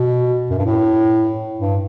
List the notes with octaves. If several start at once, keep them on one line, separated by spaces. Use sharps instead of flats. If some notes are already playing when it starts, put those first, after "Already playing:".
Already playing: B2
F#2
G2
A2
G2